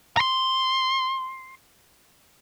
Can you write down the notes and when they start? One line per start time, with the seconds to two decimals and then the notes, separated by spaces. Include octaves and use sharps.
0.17 A#5 C6